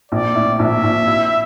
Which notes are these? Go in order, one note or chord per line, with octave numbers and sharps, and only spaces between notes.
A#1 D5
A2
A#1 E5
A#1
E4